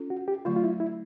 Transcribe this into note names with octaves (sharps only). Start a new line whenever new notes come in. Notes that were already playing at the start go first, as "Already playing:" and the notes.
Already playing: C#4 F4 A4
F#4
G4
D3 F#3 A3 F4
F4
E4
E4